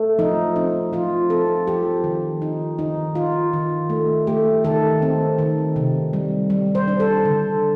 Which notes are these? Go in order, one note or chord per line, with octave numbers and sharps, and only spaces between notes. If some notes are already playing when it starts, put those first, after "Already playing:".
Already playing: A3
F3 D#4
C4 D#4
F3 F4
C4 A4
F3 G4
D#3
D#4
D#3 D#4
D#4 F4
D#3
A3
A3 G4
D#3 A4
C4
D#3
C3
G3
G3
C5
D4
A4
D3